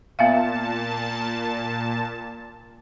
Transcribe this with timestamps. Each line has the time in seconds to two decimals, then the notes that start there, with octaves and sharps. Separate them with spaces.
0.19 A#2 B3 E5 F5 A5